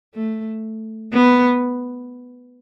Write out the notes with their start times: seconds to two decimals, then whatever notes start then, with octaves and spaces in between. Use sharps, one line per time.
0.15 A3
1.13 B3